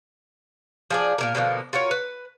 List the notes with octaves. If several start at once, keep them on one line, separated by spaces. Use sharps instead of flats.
F3 G#4 D5
A#2 C#3 A#4
B2 D3 F3 A#3
F4 F#4 A#4 C#5
B4